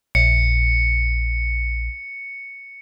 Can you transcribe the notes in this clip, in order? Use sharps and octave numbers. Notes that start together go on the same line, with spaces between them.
A#1 C#7